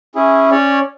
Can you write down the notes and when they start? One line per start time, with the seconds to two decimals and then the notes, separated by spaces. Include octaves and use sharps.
0.15 C#4 E4 G#4
0.51 C#4 C#5 D5